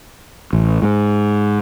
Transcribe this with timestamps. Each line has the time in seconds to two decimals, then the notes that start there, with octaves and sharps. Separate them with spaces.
0.53 A1
0.82 G#2